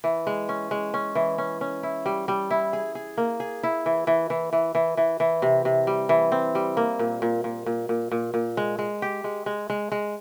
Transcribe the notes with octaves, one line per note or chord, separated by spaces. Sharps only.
E3
G#3
C#4
G#3
C#4
E3
C#4
C#4
E4
G3
G3
E4
G#4
G#4
A#3
G#4
E4
E3
E3
E3
E3
E3
E3
E3
C3
C3
G3
E3
C4
G3
A#3
A#2
A#2
A#2
A#2
A#2
A#2
A#2
G#3
G#3
G4
G#3
G#3
G#3
G#3